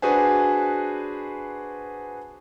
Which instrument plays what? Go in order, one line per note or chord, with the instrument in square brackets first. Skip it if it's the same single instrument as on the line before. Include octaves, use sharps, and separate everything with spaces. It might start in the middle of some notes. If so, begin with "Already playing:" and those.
[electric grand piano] D4 F#4 G#4 B4 C5 G#5